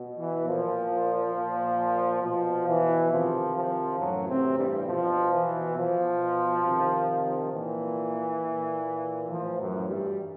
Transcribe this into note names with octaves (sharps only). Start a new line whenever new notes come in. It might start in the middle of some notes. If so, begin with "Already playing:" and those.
Already playing: B2
E3
A#2 F3
A#2
B2 F3
E3
C3 D#3 F3
F3
F#2 A2 E3 F#3
C3 C4
G2 G3
B2 F3
E3
B2 F3
C3 D#3
A#2 E3
A#2
A2 E3 F3
F#2 F#3
G2 G3